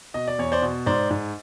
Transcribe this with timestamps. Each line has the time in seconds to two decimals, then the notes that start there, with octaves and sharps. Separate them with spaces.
0.14 B2 D#5
0.28 D5
0.39 E2 C#5
0.52 C5 D5
0.62 B2
0.86 G#2 C5 D5
1.10 G#2